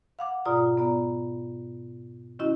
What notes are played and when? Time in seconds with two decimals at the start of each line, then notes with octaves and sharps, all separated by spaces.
0.19 F5 F#5 D6
0.45 G#2 B2 F4 D5 A#5 D#6
0.77 B3 D5 A#5
2.39 D#3 C#4 E4 F#4 D#5